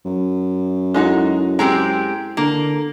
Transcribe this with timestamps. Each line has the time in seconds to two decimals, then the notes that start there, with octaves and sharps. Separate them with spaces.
0.05 F#2
0.94 G#3 D#4 E4 F#4 A4
1.59 G#3 C4 G4 A#5
2.37 D3 A#3